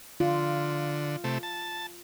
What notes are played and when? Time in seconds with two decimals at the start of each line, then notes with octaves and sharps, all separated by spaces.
0.20 D3 F4
1.24 C3 A3
1.43 A5